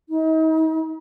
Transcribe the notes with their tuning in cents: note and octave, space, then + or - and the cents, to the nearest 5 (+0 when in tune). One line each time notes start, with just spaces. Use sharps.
D#4 +40